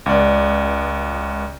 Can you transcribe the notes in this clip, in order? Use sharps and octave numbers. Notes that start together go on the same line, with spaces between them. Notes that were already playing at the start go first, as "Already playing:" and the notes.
C#2 D5